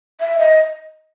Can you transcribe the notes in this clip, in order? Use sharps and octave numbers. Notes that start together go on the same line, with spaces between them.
E5
D#5